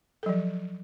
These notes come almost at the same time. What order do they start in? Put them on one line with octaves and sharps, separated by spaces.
A4 F#3 F3